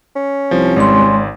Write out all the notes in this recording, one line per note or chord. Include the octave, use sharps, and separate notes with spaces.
C#4
C2 F3
G#1 G#3 D5 C6